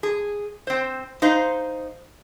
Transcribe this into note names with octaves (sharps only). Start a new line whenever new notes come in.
G#4
C4 C5
D#4 C5 F5